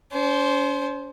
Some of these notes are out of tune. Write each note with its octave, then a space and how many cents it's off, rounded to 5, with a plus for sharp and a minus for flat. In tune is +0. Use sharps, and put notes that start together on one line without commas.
C#4 +45 C5 +0